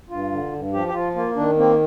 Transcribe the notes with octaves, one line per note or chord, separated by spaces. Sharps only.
G2 F4
D3
G2
F3 G4
G4
F3 F4
A#3 F4
D#3 D4
A#3 C4